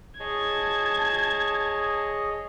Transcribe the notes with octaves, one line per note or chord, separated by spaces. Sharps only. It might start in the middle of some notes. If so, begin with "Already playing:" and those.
G#4 C#5 D#5 A5 G#6